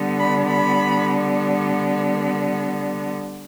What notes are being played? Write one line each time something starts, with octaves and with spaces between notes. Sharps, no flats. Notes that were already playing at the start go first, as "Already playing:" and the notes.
Already playing: D3 G3 B3
B5
B5